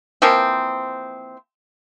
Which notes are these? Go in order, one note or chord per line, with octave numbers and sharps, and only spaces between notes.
E3 F3 A#3 C4